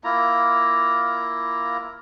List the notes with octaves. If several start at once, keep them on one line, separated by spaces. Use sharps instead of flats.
A#3 E4 F4 A#5